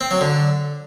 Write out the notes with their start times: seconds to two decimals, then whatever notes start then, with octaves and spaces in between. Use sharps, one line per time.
0.01 C4
0.11 F#3
0.21 D3